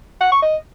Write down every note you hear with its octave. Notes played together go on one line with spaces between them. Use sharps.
F#5
C#6
D#5